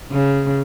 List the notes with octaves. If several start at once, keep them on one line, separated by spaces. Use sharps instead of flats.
C#3